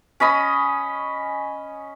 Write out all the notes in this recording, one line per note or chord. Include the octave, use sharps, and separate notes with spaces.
C#4 D#5 B5 D#6